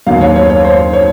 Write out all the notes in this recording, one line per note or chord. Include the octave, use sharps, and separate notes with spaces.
D#2 D#3 F#3 F5
C#5
C#5
C#5
C5
C#5